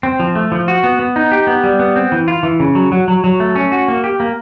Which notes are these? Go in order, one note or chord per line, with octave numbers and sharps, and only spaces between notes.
C4
F3
A3
F3
F#4
B3
B3
D#4
G4
B3
G3
B3
C4
E3
F4
E3
C#3
F#3
F#3
F#3
F#3
A3
C#4
F#4
A#3
G4
A#3